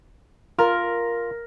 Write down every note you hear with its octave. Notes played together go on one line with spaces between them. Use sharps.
F4 A#4